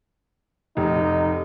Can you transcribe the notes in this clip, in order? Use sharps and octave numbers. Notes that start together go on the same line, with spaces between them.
F1 D#4